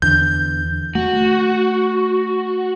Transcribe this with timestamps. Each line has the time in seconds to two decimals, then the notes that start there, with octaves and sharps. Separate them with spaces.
0.02 E2 D3 G6
0.95 A3 F#4